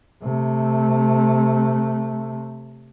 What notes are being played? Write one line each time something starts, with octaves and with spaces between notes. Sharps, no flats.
C3 A3